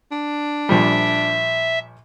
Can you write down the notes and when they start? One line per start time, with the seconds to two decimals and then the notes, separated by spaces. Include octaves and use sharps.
0.12 D4
0.69 A#1 F3 G3 E5